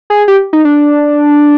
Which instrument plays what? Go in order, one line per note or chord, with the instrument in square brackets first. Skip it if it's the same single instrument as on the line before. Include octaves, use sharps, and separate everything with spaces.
[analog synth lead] G#4
G4
D#4
D4